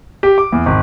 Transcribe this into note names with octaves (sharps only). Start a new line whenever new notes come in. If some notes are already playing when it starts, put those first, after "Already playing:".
G4
D6
E2
G#1